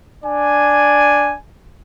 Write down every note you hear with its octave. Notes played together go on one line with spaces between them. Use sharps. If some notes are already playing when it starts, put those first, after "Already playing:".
D4 D5 G#5